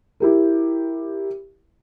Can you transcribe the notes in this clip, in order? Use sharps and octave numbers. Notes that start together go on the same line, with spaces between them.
E4 G4 A#4